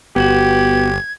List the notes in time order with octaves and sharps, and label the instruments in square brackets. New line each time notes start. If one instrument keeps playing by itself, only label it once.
[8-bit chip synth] G1 [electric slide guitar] B3 F#4 [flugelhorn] G4 [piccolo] G#6